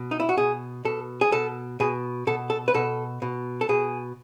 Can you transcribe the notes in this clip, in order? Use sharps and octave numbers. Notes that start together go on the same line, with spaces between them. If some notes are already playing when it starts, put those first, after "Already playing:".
Already playing: B2
D#4
E4
F#4
B2 G#4
B2 A4
G#4
B2 A4
B2 G#4
B2 A4
A4
B4
B2 A4
B2
A4
B2 G#4